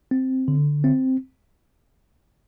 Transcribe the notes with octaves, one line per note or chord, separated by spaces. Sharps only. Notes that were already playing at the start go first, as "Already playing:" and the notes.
C4
D3
C4